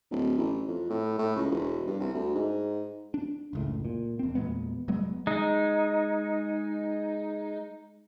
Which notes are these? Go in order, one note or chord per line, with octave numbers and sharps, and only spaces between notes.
D1
A1
F2
A2
A2
C#2
E1
G2
C2
D2
G#2
D4
F#1 C#2 A2
A#2
E1 C4
E2 A#2 G#3 B3
F1 F#3 G#3 B3
G#3 D#4